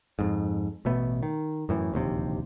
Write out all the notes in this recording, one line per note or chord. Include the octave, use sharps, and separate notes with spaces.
F2 G#2
A1 B2 A3 B3
D#3
F#2 A2 E3
D1 A#1 D#2 C3